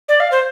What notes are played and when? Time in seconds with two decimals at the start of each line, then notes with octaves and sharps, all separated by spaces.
0.09 D5
0.20 F5
0.32 C5